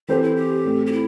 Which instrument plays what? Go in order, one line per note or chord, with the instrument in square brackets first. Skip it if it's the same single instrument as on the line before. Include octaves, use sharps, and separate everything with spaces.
[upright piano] E3 C4 A4 C5 [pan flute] G4
[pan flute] E4
G4
[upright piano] A2 A3 C4
[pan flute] G4
E4